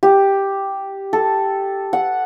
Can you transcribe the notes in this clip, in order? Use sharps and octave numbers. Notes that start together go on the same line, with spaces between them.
G4
A4
F#5